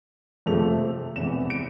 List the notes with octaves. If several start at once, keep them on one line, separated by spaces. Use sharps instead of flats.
F2 C3 F3 A3 C4 F7
E1 E2 C3 E3 E7
D7